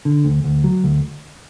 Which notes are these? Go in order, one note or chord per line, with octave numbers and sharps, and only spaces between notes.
D3
D2
D2
F#3
D2